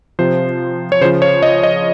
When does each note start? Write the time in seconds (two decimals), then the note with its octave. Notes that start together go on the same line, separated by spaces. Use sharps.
0.19 C3 F3 C5
0.92 C#5
1.01 C#3 C5
1.05 F3
1.22 C#5
1.42 D#5
1.63 D#5